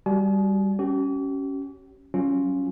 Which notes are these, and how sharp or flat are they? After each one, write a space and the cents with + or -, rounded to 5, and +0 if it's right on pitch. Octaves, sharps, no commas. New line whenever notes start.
G3 +0 F#4 +20 G#5 +45
C#4 +0 G4 -45
F#3 +25 C#4 +0 F4 +0